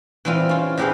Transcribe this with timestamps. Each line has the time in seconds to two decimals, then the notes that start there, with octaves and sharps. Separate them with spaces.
0.25 E3 G3 C4 F4
0.49 C#4 F4
0.77 E2 E3 G4 G#4 B4 F5